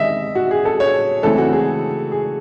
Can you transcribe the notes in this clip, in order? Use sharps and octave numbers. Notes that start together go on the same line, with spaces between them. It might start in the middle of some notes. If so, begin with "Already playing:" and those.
Already playing: D#3 G#3 D#5 E5
F#4
G#4
A4
C#5
C#3 E3 A3 C4 A4
F#4
G#4
G#4